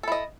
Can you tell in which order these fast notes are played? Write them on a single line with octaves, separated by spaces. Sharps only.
A4 E4 D#5